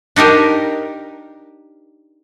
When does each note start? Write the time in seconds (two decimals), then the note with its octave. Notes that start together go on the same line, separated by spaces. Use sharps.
0.16 D4 D#4 G4 A#4